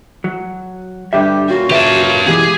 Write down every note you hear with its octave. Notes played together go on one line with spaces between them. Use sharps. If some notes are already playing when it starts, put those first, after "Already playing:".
F#3
G2 D3 G3 G4 E5
A#2 C#4 F4 F#4
C#3 G4 B4 E5 A5
B2 E3 G#3 G4 G#4